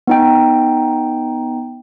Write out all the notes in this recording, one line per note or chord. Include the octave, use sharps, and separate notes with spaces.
B3 D#4 G5